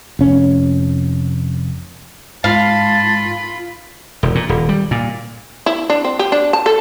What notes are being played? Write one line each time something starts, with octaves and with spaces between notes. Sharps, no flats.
F1 C#4
G#2 F4 F5 A5 B5
E1
A#2
D#1
G3
A#2
E4
D4
C4
G4
D4
A5
A4